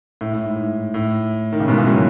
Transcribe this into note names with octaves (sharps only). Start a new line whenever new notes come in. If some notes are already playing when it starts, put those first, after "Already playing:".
A2
A2
G#2
A2
D#3
C#3
G#2 B2
C#3 E3
D#3 F#3